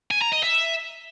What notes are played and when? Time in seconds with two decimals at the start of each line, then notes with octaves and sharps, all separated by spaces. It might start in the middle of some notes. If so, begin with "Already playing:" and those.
0.11 G#5
0.22 A#5
0.33 D#5
0.44 E5